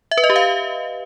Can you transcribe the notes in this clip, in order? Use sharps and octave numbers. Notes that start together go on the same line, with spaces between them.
E5
B4
D#5
G4
F5